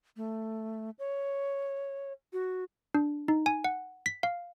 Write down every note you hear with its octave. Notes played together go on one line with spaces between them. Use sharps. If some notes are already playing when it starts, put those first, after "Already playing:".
A3
C#5
F#4
D4
D#4
G#5
F#5
B6
F5